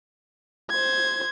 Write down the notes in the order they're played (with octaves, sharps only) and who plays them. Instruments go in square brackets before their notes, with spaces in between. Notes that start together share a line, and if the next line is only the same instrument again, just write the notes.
[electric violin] C5 G#6